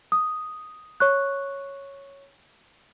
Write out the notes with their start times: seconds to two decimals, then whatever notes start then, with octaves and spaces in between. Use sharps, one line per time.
0.12 D#6
1.00 C#5 C#6 F#6